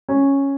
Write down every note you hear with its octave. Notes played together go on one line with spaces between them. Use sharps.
C#4